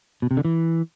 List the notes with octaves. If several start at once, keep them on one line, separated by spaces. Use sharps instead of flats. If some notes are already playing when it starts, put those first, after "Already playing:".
B2
C3
D3
E3